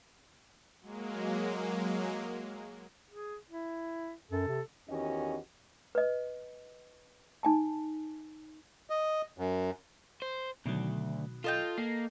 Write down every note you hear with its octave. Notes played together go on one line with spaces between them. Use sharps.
F#3 G#3 A#3
G#4
E4
F#2 A4
C3
E2 D#3 C#4 F#4 G4 D#5
B4 D#5
D#4 G#5 A5
D#5
F#2
C5
D2 B2 D#3 F#3
F4 A4 D#5 G5
A#3 A#6 C7